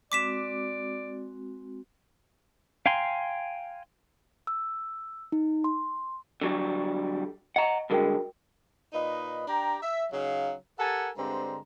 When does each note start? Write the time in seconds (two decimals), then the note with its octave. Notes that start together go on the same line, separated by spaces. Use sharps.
0.12 G#3 C4 F#4 D5 D6 B6 E7
2.86 F5 G5 G#5 A#5 C6
4.47 E6
5.32 D#4
5.64 C6
6.41 D3 F#3 G3
7.56 D#5 F#5 A#5
7.90 G2 D3 G#3 F#4 A#4 G5
8.93 A#2 D#4 B4 D#5
9.48 D4 G4 G5 A#5
9.82 E5
10.12 C#3 F#3 D#4 F5
10.79 G4 A4 A#4 F#5 G#5 A5
11.18 G2 D3 G#3 C4 C5 A#5